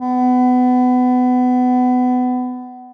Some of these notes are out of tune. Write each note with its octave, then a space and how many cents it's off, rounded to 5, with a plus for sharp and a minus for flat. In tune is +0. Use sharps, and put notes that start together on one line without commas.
B3 +25